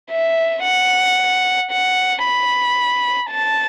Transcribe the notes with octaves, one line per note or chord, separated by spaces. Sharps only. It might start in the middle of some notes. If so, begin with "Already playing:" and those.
E5
F#5
F#5
B5
A5